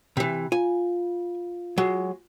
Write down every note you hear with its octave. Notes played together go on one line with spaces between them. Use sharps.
C3 E3
F4 G#5
F#3 G#3